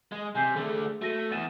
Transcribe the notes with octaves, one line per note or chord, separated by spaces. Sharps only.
G#3
C3 G#5 G6 C7
D3 A3 G#4
A3 F#4 A#6 D#7
E2 A6 D#7 E7